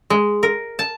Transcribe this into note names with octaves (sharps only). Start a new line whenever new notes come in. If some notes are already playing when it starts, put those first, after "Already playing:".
G#3
A#4
A5